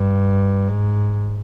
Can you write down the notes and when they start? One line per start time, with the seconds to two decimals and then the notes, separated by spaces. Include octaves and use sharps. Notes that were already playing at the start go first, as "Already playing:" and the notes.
Already playing: G2
0.68 G#2